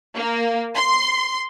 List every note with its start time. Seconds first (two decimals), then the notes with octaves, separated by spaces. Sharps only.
0.14 A#3
0.75 C6